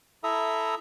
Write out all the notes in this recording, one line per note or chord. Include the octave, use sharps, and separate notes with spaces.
E4 A4 E5 A#5 D#6